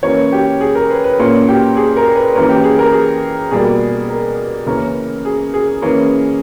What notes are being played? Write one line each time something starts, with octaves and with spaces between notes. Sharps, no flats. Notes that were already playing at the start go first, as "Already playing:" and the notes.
E3 A#3 C#4 C#5
G4
G#4
A#4
B4
B4
A#2 A#3 C#4 C#5
G4
G#4
A#4
B4
E3 A#3 C#4 A#4
G4
G#4
A#4
G#4
B2 G3 A#3 G#4
A#4
C#3 E3 A#3 C#4 A#4
G#4
G#4
E3 A#3 C#4